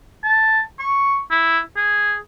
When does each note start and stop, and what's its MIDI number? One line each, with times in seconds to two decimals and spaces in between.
0.24 0.61 81
0.79 1.19 85
1.31 1.59 64
1.76 2.16 68